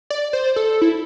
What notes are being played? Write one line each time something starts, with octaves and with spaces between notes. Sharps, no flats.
D5
C5
A4
E4